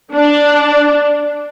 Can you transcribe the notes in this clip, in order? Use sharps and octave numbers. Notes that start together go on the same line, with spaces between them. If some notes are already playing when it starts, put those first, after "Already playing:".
D4